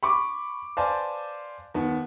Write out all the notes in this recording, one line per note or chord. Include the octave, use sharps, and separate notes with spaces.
B5 C#6 D6
B4 C5 D5 F5 G#5 A5
D#2 B3